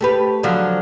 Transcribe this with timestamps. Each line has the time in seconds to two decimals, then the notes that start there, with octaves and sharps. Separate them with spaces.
0.01 A3 G4 B4
0.43 D3 F3 F#3